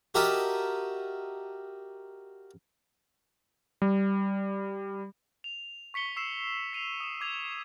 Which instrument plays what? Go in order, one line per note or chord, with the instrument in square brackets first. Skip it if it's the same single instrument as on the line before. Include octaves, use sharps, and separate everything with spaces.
[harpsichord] F#4 G4 A#4 D#5 E5 A5
[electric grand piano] G3
[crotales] F7
C#6 B6 C#7 G7
C#6 E6 C7 E7
B6 D#7 F7
D#6 E7
D6 G#6 F7